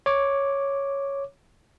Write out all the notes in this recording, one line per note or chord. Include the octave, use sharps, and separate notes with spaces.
C#5 D6